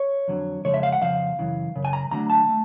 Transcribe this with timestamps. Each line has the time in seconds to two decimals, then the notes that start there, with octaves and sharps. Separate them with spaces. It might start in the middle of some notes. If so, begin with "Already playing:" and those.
Already playing: C#5
0.28 F2 D3 F#3
0.65 F2 C#3 F3 G#3 C#5
0.74 E5
0.83 F5
0.93 F#5
1.01 F2 C#3 F3 F5
1.39 F#2 C#3 E3
1.76 F#2 C#3
1.85 G#5
1.93 A#5
2.11 F#2 D3 F#3 A3 A#5
2.30 A5
2.49 A3